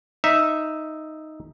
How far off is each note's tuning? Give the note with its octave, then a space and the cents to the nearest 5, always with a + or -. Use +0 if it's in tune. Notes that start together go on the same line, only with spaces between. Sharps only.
D#4 +0 E5 +0